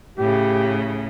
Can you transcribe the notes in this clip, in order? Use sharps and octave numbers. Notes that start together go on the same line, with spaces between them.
A2 C#3 G4